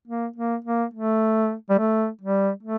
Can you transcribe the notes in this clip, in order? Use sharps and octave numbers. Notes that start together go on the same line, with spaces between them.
A#3
A#3
A#3
A3
G3
A3
G3
A3